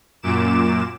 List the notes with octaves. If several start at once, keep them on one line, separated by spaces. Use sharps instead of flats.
F#2 A#2 D6 E7